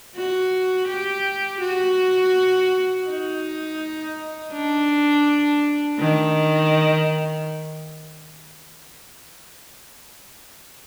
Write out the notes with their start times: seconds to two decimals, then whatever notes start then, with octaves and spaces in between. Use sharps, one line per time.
0.16 F#4
0.88 G4
1.61 F#4
3.07 D#4
4.53 D4
5.99 D#3